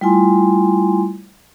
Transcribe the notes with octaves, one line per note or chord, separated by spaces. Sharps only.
G3 A3 E4 F4 G#5 C6